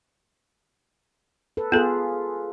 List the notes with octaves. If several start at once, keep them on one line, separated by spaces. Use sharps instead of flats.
A4 B4
B3 F4 G#4 A4